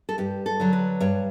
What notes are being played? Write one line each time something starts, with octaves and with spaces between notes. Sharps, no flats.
A4
G2 G4
A4
D3 F#3
B4
G2 C#5